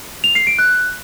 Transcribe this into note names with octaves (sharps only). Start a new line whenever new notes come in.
F7
C7
D7
F#6